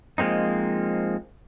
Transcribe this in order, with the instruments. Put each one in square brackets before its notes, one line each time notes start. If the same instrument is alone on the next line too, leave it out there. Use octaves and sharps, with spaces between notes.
[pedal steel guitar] F3 G#3 A#3 C4 D#4